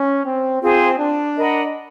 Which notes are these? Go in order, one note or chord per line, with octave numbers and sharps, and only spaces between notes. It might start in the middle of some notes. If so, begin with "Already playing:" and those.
Already playing: C#4
C4
C4 F4 G#4 C5
D4
A#4 D#5 F#5 B5